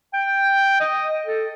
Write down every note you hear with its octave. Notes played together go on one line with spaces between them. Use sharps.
G5
D#5
A4